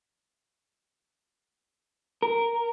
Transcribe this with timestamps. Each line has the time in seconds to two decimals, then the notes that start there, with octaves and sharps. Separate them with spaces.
2.22 A#4